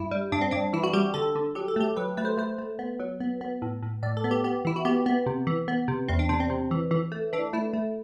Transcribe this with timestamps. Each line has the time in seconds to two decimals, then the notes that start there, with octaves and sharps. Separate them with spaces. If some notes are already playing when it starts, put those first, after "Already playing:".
Already playing: G2 E4
0.11 G3
0.32 G2 D4
0.41 C4
0.51 G2 D4
0.73 E3 E4
0.84 F#4
0.93 G3 G4
1.14 D3 A4
1.35 D3
1.55 F#3 G4
1.68 A4
1.76 A3 G4
1.97 F#3 B4
2.17 A3 B4
2.25 C5
2.37 A3 C5
2.58 A3
2.79 B3
3.00 F#3
3.20 B3
3.41 B3
3.62 A2
3.83 A2
4.03 A2 D5
4.17 A4
4.24 B3
4.31 G4
4.44 B3 G4
4.65 E3 E4
4.76 F#4
4.85 B3 G4
5.06 B3
5.26 C3
5.47 E3
5.68 B3
5.88 C3
6.08 E2 C4
6.19 D4
6.29 C3 D4
6.40 C4
6.50 C3
6.71 E3
6.91 E3
7.12 A3
7.33 E3 D4
7.53 A3 E4
7.73 A3